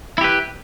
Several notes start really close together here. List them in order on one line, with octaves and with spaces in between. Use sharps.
E4 G4 B4